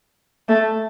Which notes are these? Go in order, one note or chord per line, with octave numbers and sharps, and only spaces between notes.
A3